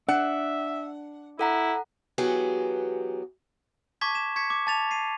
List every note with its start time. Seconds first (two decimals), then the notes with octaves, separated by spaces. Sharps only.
0.09 D4 E5 F#5
1.39 E4 A4 F#5 A#5
2.18 E3 F#3 B3 G4 G#4
4.01 A5 C#6 D6 G#6 B6 E7
4.15 E7
4.36 C#6 G#6 B6 C#7
4.50 D6
4.67 A5 A6 F7
4.91 C7 D#7